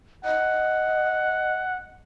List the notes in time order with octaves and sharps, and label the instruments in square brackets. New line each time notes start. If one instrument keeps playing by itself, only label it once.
[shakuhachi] D#5 [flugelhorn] F#5